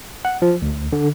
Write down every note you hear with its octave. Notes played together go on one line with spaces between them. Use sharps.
F#5
F3
D2
D3